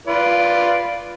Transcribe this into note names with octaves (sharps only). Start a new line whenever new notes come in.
F4 B4 D5